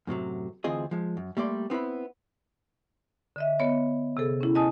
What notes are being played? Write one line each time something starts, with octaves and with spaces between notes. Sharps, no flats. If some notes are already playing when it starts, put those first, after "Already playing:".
F#2 A2 C3 F#3
D2 E3 C4 F4 G#4 D#5
F3 G#3
F#2
G3 A3 A#3 D5 C6
B3 C4 E4 B4 B5
D3 D#5 E5
B3 C#5 D#5
C3 G#4 A4
C#4 E4
D#5 G#5 A5 D#6